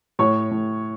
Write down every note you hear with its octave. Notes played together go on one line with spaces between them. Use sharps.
A2 C#5 C#6
A2